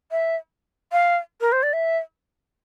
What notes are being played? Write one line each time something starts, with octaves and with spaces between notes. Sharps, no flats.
E5
F5
A#4
C5
D5
E5